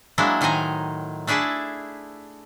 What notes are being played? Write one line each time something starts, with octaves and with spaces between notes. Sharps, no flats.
F#3 G#3 A#3 D4 E4
A2 D#3 C5 D#5 G#5 A#5
A3 D4 E4 G#4 E5 A5